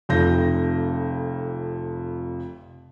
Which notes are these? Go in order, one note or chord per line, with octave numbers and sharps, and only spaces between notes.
F1 F2 G6 A#6